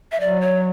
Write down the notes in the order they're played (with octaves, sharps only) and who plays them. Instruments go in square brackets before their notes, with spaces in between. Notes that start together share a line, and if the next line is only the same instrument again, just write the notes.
[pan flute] E5
[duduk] F#3 [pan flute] D5
[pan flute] C#5